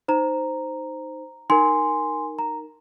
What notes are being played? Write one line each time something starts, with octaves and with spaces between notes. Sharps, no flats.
D#4 C5 A#5
D#4 A#4 G#5 C6
A#5